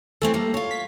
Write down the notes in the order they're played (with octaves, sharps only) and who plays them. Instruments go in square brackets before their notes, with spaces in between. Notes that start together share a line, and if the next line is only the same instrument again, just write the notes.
[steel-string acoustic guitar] E3 A3 C4 [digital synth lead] A4
[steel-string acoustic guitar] G3 A#3
F4 C#5
[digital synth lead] B6